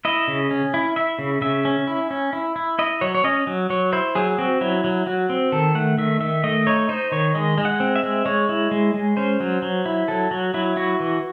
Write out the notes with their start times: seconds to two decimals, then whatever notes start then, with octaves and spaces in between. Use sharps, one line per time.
0.05 E4 D#5
0.28 C#3
0.51 C#4
0.74 E4
0.96 E4 E5
1.19 C#3
1.42 C#3 E5
1.65 C#4
1.87 E4
2.11 C#4
2.33 E4
2.56 E4
2.79 E4 D#5
3.01 F#3 C#5
3.15 C#5
3.24 C#4 D#5
3.47 F#3
3.70 F#3 C#5
3.93 E4 C5
4.15 F#3 G#4
4.38 C4 F#4
4.61 F#3 E4
4.84 F#3
5.06 F#3 F#4
5.29 C4
5.52 D#3 A4
5.75 A3 F#5
5.98 D#3 E5
6.20 D#3 E5
6.44 A3 D#5
6.67 D#4 C#5
6.89 D#4 C5
7.12 D#3 C#5
7.35 G#3 D#5
7.58 G#3
7.65 F#5
7.80 C4
7.96 E5
8.03 G#3
8.26 G#3 C#5
8.49 E4
8.71 G#3
8.94 G#3
9.17 C#4 C5
9.40 F#3
9.62 F#3
9.86 E4
10.08 F#3 A4
10.31 F#3 F#4
10.54 F#3 E4
10.76 E4 F#4
11.00 E3